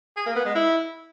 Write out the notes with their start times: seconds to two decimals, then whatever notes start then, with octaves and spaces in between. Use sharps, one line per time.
0.16 G#4
0.26 A#3
0.36 B3
0.45 G#3
0.55 E4